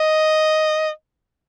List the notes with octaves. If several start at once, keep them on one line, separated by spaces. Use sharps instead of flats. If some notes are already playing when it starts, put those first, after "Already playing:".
Already playing: D#5